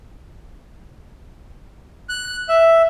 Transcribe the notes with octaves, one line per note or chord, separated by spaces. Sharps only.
F#6
E5